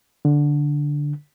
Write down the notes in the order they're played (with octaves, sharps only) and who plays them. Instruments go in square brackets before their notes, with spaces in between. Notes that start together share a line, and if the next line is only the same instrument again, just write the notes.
[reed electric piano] D3